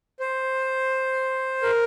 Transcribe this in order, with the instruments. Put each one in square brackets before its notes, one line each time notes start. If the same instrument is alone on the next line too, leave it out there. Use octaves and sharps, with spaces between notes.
[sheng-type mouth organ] C5
A#4